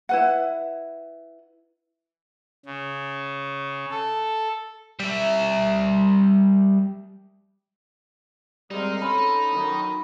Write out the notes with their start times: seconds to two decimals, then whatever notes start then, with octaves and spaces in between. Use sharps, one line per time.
0.09 E4 B4 F#5
2.65 C#3
3.91 A4
4.99 G3 E5
8.71 G3 G#3 C4 D#4 A#4 F5
9.02 C#4 A4 B5 C6
9.50 D#3 F#3